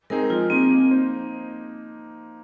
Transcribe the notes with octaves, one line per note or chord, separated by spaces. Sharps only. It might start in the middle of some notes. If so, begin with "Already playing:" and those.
G#3 C4 D#4 G#4 A#4
F3 F4
A#3 C4 D#4 G#4
A#3
D#4 C5